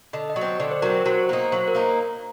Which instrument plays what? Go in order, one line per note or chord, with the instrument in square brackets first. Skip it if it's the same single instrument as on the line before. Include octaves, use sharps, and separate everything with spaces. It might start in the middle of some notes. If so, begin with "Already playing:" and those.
[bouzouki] D3 [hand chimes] D#5
[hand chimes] D#5
[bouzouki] F#3
C4
[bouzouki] D3 [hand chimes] D5
[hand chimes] C5
[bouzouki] F#3 C4 [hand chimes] A#4
[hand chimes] C5
[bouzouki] F#3 [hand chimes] C5
[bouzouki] A#3 D#4
[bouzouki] F#3 [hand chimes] C5
[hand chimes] A#4
[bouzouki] A#3 D#4